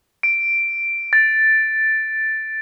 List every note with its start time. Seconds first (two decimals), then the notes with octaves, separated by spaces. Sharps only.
0.23 D7
1.13 A6